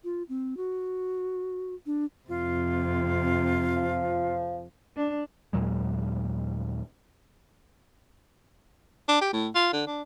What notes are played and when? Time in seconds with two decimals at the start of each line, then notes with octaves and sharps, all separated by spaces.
0.04 F4
0.29 C4
0.57 F#4
1.86 D4
2.29 F2 C3 F4
3.77 F3
4.97 D4
5.53 D#2 A#2 F#3 G#3
9.08 D4
9.21 G4
9.33 A2
9.55 F4
9.73 D3
9.87 D4